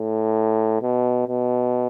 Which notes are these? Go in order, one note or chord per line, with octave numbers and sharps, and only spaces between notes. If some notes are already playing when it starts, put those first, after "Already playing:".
Already playing: A2
B2
B2